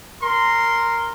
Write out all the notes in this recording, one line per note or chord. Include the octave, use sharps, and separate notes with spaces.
A#4 C6